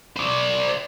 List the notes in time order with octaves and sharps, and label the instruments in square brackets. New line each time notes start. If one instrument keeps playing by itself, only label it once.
[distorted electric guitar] C5 D5